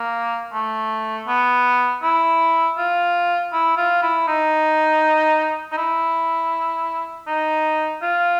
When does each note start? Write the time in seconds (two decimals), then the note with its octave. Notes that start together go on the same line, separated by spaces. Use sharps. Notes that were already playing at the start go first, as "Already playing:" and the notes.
Already playing: A#3
0.53 A3
1.28 B3
2.03 E4
2.78 F4
3.53 E4
3.77 F4
4.02 E4
4.28 D#4
5.72 D#4
5.77 E4
7.27 D#4
8.02 F4